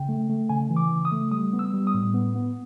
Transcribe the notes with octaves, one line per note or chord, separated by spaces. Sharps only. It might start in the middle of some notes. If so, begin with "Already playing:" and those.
Already playing: C#3 G5
A3
A3
C#3 G#5
E3
D6
C#3
D#6
A3
G3 D#6
B3
E6
G3
D#6
A2
B3
B3